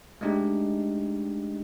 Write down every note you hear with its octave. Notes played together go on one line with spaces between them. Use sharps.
G#3 A3 D4 D#4 G4